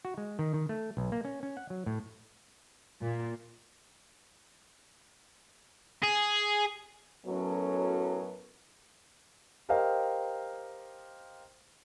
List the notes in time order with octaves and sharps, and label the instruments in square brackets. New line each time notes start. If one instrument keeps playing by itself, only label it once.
[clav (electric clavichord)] F#4
G#3
D#3
D#3
A3
B1
A#3
C#4
C#4
F#5
F#3
A2
[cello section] A#2
[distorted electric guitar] G#4
[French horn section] F#2 A2 F#3 B3 C#4 A4
[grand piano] G4 A#4 C5 D#5 F5 G5